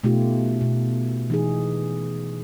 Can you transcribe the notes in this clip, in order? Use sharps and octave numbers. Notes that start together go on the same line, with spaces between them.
B2 A3 D#4 F4 G4
B2
E3 D#4 G#4